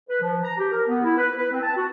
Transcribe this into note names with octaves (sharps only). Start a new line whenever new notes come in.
B4
F3
A#5
G4
A#4
B3
E4
B4
B4
C4
A5
F#4